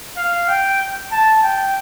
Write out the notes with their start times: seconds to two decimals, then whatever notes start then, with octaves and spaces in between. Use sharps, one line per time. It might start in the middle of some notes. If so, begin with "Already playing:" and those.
0.17 F5
0.48 G5
1.12 A5
1.43 G5